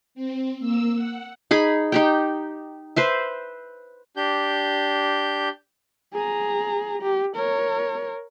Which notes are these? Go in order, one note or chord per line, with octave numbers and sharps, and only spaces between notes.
C4
A#3 E6
F#5
D#4 G#4 B5
D#4 G4 G5
B4 C5 E5
D4 G4 G6
G#4 A#5
G4
A#4 C#5